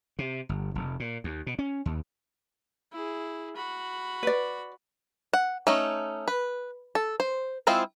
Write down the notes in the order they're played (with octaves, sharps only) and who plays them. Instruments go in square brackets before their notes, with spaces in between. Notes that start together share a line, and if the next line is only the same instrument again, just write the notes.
[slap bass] C3
G1
F1
A#2
D#2
B2
C#4
D#2
[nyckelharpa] E4 G#4
F#4 B5
[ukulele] B4 D5
[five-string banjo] F#5
A3 C#4 D#4
B4
A4
C5
G#3 C4 E4 F4 C5